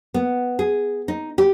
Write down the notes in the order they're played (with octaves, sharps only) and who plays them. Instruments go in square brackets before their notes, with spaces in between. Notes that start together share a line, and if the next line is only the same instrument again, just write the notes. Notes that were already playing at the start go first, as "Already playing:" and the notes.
[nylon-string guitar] B3
G#4
D#4
G4